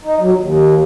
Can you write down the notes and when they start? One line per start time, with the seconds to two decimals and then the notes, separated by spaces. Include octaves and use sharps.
0.05 D#4
0.19 F#3
0.38 D#2